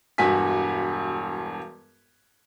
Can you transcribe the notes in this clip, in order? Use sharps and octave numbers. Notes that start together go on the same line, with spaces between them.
E1 G2 F#4 G#5 B6